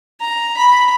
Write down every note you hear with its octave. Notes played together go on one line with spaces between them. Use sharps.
A#5
B5